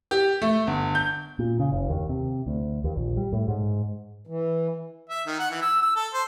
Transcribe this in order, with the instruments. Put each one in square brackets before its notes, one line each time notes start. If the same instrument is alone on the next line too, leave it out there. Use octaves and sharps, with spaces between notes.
[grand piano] G4
A3
G1
G6
[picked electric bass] A#2
C#3
F#1
D#2
C3
D2
D#2
A#1
G3
A2
G#2
[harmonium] E3
[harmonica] E5
D#3
F#5
E3
E6
E6
A4
C5